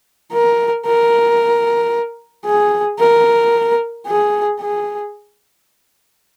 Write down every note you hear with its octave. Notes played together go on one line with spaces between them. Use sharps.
A#4
A#4
G#4
A#4
G#4
G#4